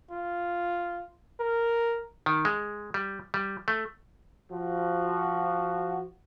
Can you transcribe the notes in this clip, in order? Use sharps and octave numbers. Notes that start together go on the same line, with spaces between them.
F4
A#4
D#3
G#3
G3
G3
A3
F3 F#4